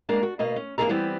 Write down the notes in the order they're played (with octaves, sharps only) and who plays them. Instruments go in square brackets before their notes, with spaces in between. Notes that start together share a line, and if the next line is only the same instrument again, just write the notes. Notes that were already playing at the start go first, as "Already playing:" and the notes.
[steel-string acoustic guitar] G#3 A#3 D4 A#4
F#4
D2 B2 A#3 D#5
C#4
E2 A#3 D4 G#4 A4 A#5
E3 G3 B3 C4